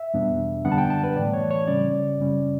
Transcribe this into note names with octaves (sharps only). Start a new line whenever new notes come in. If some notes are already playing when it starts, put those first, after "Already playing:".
Already playing: E5
E2 B2 G3 B3 D4
F#2 D3 G3 B3 D4 F#5
A5
G5
A5
B4
A2 E3 A3 D5
C#5
C#5
C#3 G3 C#4 D5
F#2 C#3 G3 C#4